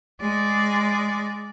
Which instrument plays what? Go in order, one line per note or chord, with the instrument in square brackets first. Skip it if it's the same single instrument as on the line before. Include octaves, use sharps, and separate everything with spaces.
[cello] G#3 D5